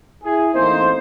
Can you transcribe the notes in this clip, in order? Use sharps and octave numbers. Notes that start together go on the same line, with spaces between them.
E4 G#4
A1 A2 A#3 C4 D#4 C5